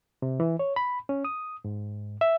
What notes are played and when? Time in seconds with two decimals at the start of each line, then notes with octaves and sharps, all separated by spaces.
0.22 C3
0.40 E3
0.59 C#5
0.76 B5
1.09 C#4
1.25 D#6
1.65 G#2
2.21 E5